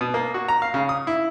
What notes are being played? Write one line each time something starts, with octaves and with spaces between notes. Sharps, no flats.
B2
A#3
F#4
A#5
F5
C#3
D#6
E4